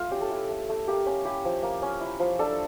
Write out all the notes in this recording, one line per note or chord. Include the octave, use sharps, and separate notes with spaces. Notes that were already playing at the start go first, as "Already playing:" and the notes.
Already playing: A3 F4
C#4 G4
A4
E4 G4
A3
A3
A#3 G4
C#4
E4 G4
F3
A#3
C#4
E4
F3
D4 A4